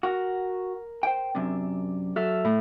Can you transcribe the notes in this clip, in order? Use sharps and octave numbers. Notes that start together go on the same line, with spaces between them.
F#4 A#4
C5 G5
F#2 C3 D4
F#3 A4 E5 F6
A2